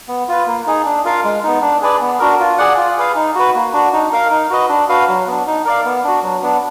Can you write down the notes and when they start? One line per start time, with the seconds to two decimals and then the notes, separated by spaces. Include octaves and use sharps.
0.08 B3
0.28 F4 B4
0.47 A#3
0.66 D#4 G#4
0.86 D4
1.05 F4 A#4 F5
1.24 G#3
1.43 B3 D#4
1.62 D4
1.82 G#4 B4 D5
2.01 B3
2.19 D4 F#4 A#4
2.40 F4
2.58 G#4 D5 F#5
2.78 F4
2.97 G#4 B4 F5
3.15 D#4
3.35 F#4 B4
3.55 A#3
3.73 D4 F#4
3.93 D#4
4.13 A#4 F5
4.31 D#4
4.50 F#4 B4 D#5
4.69 D4
4.89 F#4 B4 F5
5.08 F#3
5.27 B3 D4
5.47 D#4
5.65 A#4 D5 F5
5.85 B3
6.04 D4 F#4
6.23 F#3
6.42 B3 D4